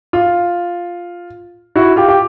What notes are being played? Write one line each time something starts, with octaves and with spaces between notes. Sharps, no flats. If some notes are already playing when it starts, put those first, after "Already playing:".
F4
E4 F#4
F4 G4
G4